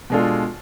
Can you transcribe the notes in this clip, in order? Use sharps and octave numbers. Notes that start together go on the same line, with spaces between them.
B2 G#3 D4 F4 A4